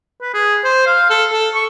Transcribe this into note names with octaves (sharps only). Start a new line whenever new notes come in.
B4
G#4
C5
F5
A4
A4
C#6